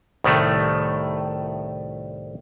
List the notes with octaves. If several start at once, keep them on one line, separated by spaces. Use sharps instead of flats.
C2 A2 D#3 A3